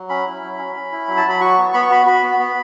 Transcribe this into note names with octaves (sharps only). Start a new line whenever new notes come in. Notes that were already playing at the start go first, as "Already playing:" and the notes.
Already playing: F#3
C#4 B5
E4
F#3
C#4
C#4
E4
F#3
A5
F#3 B5
F#4 C#6
B3
B3 B5
C#6
F#4 B5
F#4 B5
B3
B3